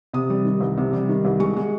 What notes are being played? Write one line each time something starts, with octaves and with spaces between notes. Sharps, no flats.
C3 D#6
G3
D#3
C2
C3
G3
D#3
C2
G#3 C#6
G#3